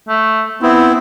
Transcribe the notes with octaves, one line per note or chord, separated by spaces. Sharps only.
A3
B3 C4 E4